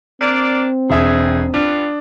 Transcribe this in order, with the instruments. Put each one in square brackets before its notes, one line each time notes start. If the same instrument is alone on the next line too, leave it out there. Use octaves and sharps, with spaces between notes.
[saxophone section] A#3 D4 D5 [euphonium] C4
[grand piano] E1 E5 D#6 [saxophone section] F2 G#4
[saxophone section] G3 B3 F4 [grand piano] D4